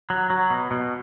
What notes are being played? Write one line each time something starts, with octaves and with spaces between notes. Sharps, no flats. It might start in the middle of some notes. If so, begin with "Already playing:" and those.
F#3
F#3
B2
B2